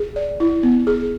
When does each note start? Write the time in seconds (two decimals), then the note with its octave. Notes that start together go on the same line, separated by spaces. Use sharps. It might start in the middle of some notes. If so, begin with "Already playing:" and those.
Already playing: G#4
0.16 D5
0.40 E4
0.63 B3
0.87 G#4